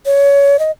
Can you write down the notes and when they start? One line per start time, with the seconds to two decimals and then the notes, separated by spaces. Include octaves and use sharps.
0.06 C#5
0.59 D#5